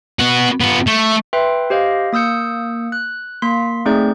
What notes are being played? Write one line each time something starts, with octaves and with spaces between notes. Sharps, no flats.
B3 F#4
B3 F4
A3
B4 E5 G5 C6
G4 C5 D#5 F5
A#3 D#6 E6 G6 C#7
F#6
A#3 C6 B6
A3 C4 D#4 G#4 D5 G6